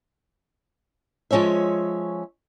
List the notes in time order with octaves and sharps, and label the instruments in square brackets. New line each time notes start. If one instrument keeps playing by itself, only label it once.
[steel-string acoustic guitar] F3 G#3 C#4 C#5 E5